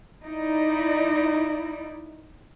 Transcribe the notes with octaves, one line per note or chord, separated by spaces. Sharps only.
D#4 E4 D5